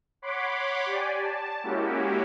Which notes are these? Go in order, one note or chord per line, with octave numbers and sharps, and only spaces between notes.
C#5 F#5 B5 C6 D6
G4 D5 G#5
A5
G#3 A#3 C#4 E4 F#4 G4